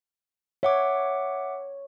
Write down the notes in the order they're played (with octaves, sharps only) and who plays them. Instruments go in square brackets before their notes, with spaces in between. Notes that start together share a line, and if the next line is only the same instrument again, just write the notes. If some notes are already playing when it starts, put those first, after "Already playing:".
[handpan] C#5 [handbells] E5 F#5 D6